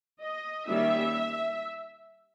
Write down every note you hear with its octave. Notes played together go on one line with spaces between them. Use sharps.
D#5
D#3 G3 A#3 C#4 E5